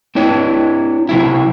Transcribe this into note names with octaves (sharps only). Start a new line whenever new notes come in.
C4 D4 E4 C#5
C3 F#3 E4